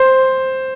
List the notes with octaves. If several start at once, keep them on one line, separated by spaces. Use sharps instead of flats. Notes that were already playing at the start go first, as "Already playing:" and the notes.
Already playing: C5